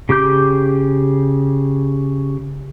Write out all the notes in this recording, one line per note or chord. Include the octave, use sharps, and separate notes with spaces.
C#3 G4 D6 G6